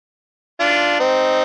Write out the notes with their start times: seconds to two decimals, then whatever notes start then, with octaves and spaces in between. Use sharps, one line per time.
0.60 D4 F4
1.00 C4 D#4